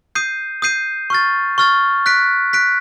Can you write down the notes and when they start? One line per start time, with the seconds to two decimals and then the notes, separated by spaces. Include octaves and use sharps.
0.15 D#6 G6 C7 D#7
0.62 D#6 G6 C7 D#7
1.10 C#6 F6 A6
1.58 C#6 F6 A6
2.06 F#6 B6 D7
2.53 F#6 B6 D7